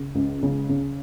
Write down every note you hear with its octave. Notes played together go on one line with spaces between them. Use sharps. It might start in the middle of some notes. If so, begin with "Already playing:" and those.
Already playing: C#3
C#2
C#3
C#3